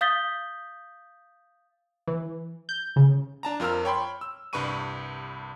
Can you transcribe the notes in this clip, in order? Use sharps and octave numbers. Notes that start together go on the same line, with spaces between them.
F5 D#6 G6 A6 B6 G7
E3
G6
C#3
D4 A5 A#5
F2 F4 A#4 E6 F6
C#5 G5 B5 C6
E6
C2 G2 B4 B5 C#6 D#7